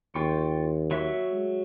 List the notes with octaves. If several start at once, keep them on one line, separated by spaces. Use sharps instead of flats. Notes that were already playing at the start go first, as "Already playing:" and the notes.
D#2 F4 G5 C#6
F#3 E5 C#6
G#3